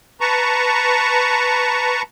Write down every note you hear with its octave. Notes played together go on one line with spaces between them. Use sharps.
B4 A5 A#5 C#6